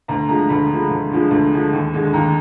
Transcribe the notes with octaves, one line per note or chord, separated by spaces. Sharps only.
D2 A#5
D3 F3 G#3 A#5
D2 B5
D3 F3 G#3
D2
D3 F3 G#3
D2
D3 F3 G#3
D#2
D3 G#3
D#2 A#5